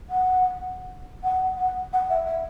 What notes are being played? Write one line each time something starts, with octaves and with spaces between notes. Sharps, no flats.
F#5
F#5
F#5
F#5
E5
E5